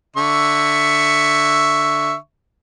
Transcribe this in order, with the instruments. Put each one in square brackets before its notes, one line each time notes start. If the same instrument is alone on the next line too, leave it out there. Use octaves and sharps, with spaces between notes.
[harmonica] D3 E5 C#6